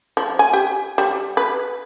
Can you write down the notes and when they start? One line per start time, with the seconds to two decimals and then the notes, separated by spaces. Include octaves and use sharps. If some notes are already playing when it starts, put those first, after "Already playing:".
0.17 F3
0.39 G#5
0.53 G4
0.98 G3
1.37 B4